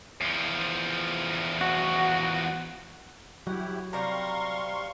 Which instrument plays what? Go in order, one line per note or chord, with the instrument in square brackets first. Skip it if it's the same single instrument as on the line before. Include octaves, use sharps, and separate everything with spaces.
[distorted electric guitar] E2 F3
[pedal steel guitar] F#4
[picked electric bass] F#3 [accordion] E4 G4 [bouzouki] F#5
[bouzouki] C3 G3 [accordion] F5 C6 C#6 [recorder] A#5